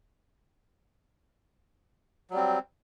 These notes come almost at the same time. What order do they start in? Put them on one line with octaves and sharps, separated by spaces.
F#3 G3 C4